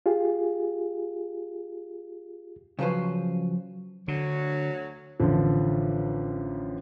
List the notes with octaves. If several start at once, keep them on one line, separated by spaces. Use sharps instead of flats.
F4 G4 G#4
C#3 F3 F#3 B4 C5
D2 D3 F#3 C#5
A1 D3 F3